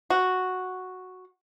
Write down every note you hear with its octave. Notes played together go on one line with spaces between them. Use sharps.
F#4